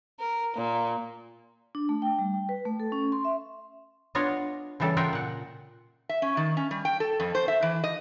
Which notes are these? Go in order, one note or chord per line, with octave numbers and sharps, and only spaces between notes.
A#4
A#2
D4
A3
G5
G3
G5
B4
A3
A4
C#4
C6
E5
B3 D4 F4 C#5 D#5 F5
C#3 E3 G3 A4
F4 A#4 E5 F#5 G5
A#2 F#5
E5
C#4
D#3
C#4
G3
G5
A4
F2
C5
E5
E3
D#5